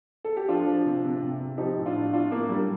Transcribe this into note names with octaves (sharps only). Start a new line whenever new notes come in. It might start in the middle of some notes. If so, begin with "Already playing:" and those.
A4
G4
F3 D4 F4
F3
C3
C3
C3
C3
F3 D#4 G4
A2
D4 F4
A2
A2 D4 F4
A2 A#3 D4
A2 G3 A#3